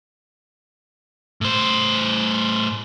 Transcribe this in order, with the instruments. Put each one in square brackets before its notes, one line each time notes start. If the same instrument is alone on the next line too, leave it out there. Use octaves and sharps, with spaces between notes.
[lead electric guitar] A2 C5